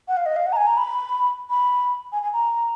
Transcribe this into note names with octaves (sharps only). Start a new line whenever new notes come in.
F#5
F5
D#5
F5
F#5
A#5
G#5
A#5
B5
B5
G#5
G#5
A#5